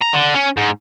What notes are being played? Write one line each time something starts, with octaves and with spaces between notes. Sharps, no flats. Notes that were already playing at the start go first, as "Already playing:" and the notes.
A#5
D3
C#4
G#2